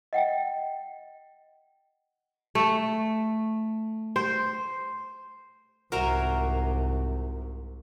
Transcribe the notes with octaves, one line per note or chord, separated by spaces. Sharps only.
D#5 F#5 G5
A3
C5
C2 G#2 F#4 A#4 C5 E5 G#5 A#5